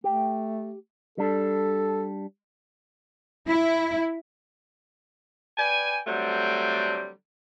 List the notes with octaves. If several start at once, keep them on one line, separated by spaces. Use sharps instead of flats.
A3 G4
G3 D4 A4
E4
B4 D5 G5 G#5
D3 F#3 G3 A3 C4